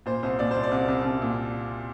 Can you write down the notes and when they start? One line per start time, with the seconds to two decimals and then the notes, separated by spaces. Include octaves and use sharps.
0.06 A#2 C5
0.23 C2 C5
0.39 A#2 D5
0.51 C5
0.56 C2
0.63 D5
0.71 C2
0.88 C2
1.05 C2
1.22 A#2